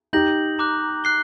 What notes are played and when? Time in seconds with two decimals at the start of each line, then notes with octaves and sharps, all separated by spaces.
0.13 D#4 G4 G6 A#6 F#7
0.59 A#5 D6 F#6
1.04 F#6 C7 G7